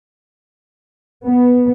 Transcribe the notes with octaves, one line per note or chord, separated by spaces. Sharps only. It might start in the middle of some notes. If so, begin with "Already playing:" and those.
B3